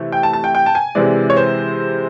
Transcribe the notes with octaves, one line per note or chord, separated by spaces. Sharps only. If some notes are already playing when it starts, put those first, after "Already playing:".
Already playing: C3 E3 A3
G5
A5
A5
G5
G5
A5
G#5
C3 E3 G#3 D5
C#5
C5